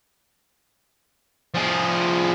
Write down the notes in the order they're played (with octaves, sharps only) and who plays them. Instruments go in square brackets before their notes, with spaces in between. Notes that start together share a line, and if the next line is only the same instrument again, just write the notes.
[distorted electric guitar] F3 G#4